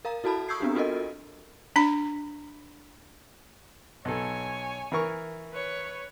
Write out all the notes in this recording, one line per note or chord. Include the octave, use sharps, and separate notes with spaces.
A#4 F5 A#5
E4 F#4 A4 A5 B5
C#6 D#6 E6 G6 G#6 C7
B3 C4 D4 F#4 G4
F4 F#4 A4 A#4 D#5
D4 B5
B1 A4 C#5 G#5
E3 A#4 C#6
B4 C#5